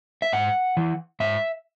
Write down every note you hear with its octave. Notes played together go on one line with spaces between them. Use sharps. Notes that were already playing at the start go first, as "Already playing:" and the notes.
E5
G#2 F#5
E3
G#2 E5